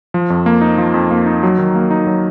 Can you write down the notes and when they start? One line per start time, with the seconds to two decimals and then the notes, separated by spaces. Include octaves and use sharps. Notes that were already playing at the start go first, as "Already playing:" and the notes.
0.14 F3
0.30 F2
0.46 A#3
0.61 D#4
0.78 F3
0.94 F2
1.11 A#3
1.26 D#4
1.43 F#3
1.58 D#3
1.75 A#3
1.91 D#4
2.07 F#3